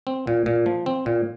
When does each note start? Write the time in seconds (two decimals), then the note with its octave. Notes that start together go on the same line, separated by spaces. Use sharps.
0.07 C4
0.27 A#2
0.46 A#2
0.66 F3
0.86 C4
1.06 A#2